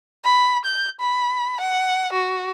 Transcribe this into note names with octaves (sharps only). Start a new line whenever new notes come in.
B5
G6
B5
F#5
F#4